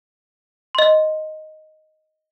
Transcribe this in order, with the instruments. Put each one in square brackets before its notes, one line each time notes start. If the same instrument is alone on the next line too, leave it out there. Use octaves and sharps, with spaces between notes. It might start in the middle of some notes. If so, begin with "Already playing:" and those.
[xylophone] D#5 C6